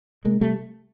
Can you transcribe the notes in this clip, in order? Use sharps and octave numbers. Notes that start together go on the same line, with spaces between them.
C3 G#3 A#3
C3 G3 A3